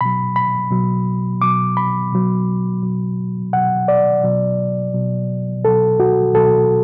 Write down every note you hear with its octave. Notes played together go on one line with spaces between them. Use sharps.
B2 F#3 B5
B5
B2 F#3
B2 F#3 D6
B5
B2 F#3
B2 F#3
B2 F#3 F#5
D5
B2 F#3
B2 F#3
B2 F#3 A4
F#4
B2 F#3 A4